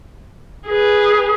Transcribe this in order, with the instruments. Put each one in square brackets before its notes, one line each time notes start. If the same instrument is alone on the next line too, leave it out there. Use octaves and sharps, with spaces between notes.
[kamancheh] G#4 B4